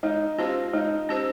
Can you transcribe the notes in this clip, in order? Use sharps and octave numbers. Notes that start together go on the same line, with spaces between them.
G#3 D#4
C#4 F4 G4 C5
G#3 D#4
C#4 G4 C5